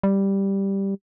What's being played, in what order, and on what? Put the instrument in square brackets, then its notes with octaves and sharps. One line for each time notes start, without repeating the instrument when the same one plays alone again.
[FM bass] G3